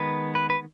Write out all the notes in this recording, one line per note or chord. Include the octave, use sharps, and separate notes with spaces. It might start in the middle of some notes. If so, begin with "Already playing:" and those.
Already playing: D#3 G#3 B3 B4
B4
B4